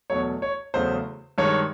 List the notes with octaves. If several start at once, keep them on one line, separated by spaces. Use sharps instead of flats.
E2 B2 F#3 A3 C#5
C#5
E2 C#3 F#3 A3 C5
G2 D#3 G#3 C#5